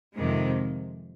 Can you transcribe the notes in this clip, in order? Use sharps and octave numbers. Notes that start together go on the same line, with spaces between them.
F2 C3 D#3 G#3